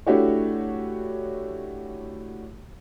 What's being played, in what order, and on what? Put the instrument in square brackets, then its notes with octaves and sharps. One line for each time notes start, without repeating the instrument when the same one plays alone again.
[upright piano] A3 D4 E4 F#4 G4 C#5